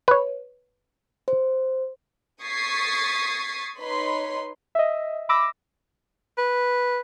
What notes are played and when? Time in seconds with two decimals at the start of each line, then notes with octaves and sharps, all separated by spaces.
0.08 B4 C#5
1.28 C5
2.42 C#6 D#6 G#6 A6 B6 C7
3.79 D#4 B4 C#5 B5 C6
4.75 D#5 E5
5.29 B5 D6 E6 A#6
6.38 B4